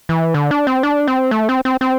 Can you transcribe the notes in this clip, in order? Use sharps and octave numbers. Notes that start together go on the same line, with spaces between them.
E3
D3
D4
C4
D4
C4
A3
C4
C4
C4